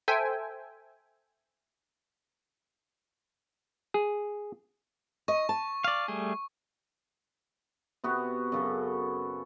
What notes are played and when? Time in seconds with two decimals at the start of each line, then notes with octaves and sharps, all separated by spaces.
0.08 A4 C5 E5 G5 G#5
3.94 G#4
5.28 D#5 C#6
5.49 A5
5.84 D5 F5
6.08 G3 A3 G#4
8.04 C3 B3 F#4
8.52 F#2 C#3 A4